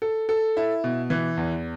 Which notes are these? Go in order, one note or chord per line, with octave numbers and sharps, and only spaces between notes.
A4
A4
E4
B2
E3
E2